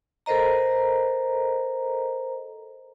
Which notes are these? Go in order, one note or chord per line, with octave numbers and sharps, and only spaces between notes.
A4 A#4 C5 D#5 A#5